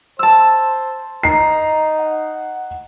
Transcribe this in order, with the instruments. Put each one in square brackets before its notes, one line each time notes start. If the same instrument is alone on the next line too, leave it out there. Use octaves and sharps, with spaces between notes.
[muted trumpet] C5 [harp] A5 E6
[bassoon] D#4 [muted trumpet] A#5 [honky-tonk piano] C7
[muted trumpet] F#5